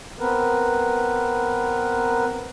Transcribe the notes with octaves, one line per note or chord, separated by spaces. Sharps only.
B3 C4 A#4 B4